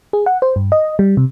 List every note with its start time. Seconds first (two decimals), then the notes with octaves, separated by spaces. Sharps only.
0.13 G#4
0.26 F#5
0.42 C5
0.56 G2
0.72 D#5
0.99 G3
1.17 C3